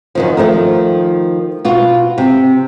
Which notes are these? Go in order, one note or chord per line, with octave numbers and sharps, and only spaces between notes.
F#2 D#3 F3
D#3 F3 A3 A#4
B2 F4 F#4
C3